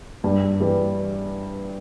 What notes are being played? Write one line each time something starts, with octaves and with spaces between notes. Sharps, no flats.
G2
E3 G3